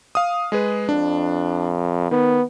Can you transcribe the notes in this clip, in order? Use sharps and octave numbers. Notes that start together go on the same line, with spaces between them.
F5 D#6
G#3 G#4 B4
F2 D4
D#3 B3